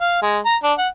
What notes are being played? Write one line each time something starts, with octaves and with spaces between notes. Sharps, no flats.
F5
G#3
A#5
D4
F#5